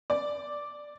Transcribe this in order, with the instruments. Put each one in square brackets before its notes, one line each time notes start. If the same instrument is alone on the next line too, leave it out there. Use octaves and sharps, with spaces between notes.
[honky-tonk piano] D5